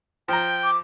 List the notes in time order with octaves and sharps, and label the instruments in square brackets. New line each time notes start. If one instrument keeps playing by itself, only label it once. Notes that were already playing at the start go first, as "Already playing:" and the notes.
[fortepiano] F3 A#5 [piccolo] G5
[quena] D6